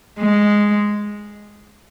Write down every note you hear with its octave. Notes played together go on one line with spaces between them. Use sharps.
G#3